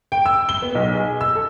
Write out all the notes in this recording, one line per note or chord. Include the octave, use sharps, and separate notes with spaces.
G5
E6
G7
B3
B1
G#4
E6
A4